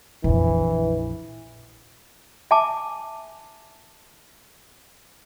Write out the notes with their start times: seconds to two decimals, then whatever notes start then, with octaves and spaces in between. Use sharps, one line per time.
0.24 A#1 F2 E3
2.51 E5 G#5 A5 D6